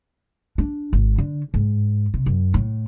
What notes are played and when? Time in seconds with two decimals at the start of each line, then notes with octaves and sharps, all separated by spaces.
0.58 D4
0.93 G#1
1.18 D3
1.54 G#2
2.14 C3
2.26 F#2
2.54 A2